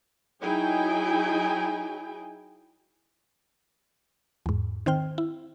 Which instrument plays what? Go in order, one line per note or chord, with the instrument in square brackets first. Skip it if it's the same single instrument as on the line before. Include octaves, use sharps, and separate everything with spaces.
[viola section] F#3 D#4 E4 G#4 G5 G#5
[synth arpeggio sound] E2 G#2
D#3 C4 C5 G5 F6
E4